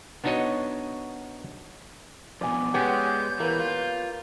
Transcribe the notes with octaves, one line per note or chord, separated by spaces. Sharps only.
B3 D4 D#4 F#4 C#5 D#5
F2 B2 D5 G#5
G#3 B3 C#4 G4 G6
E3 A#3 B4
F4